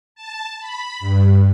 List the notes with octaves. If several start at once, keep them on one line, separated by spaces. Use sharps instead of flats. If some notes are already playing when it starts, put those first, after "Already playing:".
A5
B5
G2